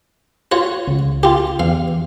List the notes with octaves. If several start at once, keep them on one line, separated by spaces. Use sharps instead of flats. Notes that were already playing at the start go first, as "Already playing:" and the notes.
F4 F#4 C#5
C#2
F4 G4
E2 F5